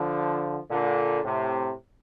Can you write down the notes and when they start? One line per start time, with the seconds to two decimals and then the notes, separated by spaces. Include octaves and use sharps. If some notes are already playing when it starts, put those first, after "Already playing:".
Already playing: D3 F3
0.70 A#2 D3
1.24 A2 C3